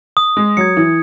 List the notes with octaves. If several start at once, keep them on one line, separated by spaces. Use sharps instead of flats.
D#6
G#3
F#3 G#6 C#7
E3